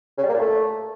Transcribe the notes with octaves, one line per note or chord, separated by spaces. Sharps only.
C#3
G3
A#3
A#2
A3